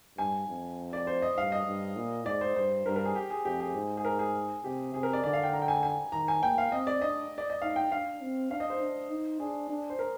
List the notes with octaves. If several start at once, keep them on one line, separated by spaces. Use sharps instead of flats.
G2 G#5
F2
D5
C5
D#5
G2 F5
D#5
G2
A#2
G#2 D5
C5
G2 C5
G2 A#4
A#4
G#4
G4
G#4
F2 G4
G#4
G#2
G#4
A#4
G#4
C3 G4
C3 G#4
A#4
D5
D3 D5
F5
G5
A#5
G5
G#5
G#5
D#3 A#5
G#5
A#3 G5
F5
C4 D#5
D5
D4 D#5
D5
D#5
D#4 F5
G5
D4 F5
C4
D4 F5
D#5
C5
D4
D#4
D4 G#4
D4
C5
A#4